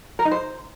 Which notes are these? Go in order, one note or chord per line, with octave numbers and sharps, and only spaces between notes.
A#4
D#4
C5